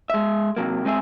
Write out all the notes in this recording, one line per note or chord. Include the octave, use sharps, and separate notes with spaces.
G#3 E5
C3 F#3 A#3
G#3 C4 G#4 E5